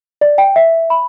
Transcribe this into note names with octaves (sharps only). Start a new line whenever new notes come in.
D5
G5
E5
B5